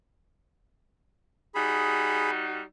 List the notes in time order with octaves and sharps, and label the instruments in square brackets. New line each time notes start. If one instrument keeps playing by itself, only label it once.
[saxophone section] G3 D#4 F#4 [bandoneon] G#4 B5